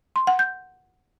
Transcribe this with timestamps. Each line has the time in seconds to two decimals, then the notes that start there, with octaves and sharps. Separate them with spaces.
0.16 C6
0.27 F#5
0.39 G6